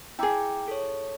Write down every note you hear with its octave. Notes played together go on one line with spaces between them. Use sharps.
E4 G#4 G5 A#5 D6
A4 C#5